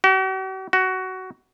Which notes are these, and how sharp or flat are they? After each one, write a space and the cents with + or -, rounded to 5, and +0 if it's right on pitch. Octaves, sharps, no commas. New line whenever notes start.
F#4 +45
F#4 +15